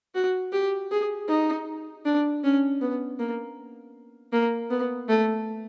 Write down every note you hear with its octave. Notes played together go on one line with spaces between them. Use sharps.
F#4
G4
G#4
D#4
D4
C#4
B3
A#3
A#3
B3
A3